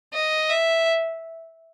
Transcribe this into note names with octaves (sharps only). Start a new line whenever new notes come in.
D#5
E5